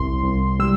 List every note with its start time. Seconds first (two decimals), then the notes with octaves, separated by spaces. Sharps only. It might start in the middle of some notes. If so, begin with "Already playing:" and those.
Already playing: C2 C6
0.24 C2
0.60 G3 E6